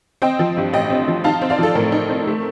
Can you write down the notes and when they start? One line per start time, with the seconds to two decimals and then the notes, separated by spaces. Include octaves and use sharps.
0.22 C4 D#5 G5
0.39 F3
0.57 G2
0.73 A1 D#5 G5
0.90 C4
1.08 F3
1.24 D#4 F5 A5
1.42 C4
1.50 D5 F5
1.58 F3 A4
1.75 A2 A#4
1.92 D#4
2.09 C4
2.27 A3